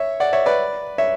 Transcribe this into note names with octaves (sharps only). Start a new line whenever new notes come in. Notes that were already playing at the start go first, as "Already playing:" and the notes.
Already playing: C#5 E5
D5 F#5
C#5 E5
B4 D5
C#5 E5